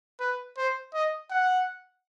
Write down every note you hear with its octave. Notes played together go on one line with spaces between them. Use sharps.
B4
C5
D#5
F#5